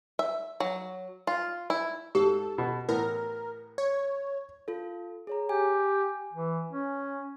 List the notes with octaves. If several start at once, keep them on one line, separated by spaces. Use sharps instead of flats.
E5
F#3
F4
E4
G#2 G4 A4
B2
A2 E3 B3 A#4
C#5
F4 A4
G#4 C#5 A#5
G4 G#5
E3
C#4